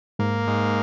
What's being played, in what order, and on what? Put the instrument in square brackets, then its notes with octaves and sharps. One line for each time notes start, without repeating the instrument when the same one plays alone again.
[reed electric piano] G#2 [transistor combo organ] A#3
[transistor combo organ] G#2